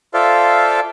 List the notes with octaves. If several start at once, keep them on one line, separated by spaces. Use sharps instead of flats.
F4 A4 C5 D5 E5 F5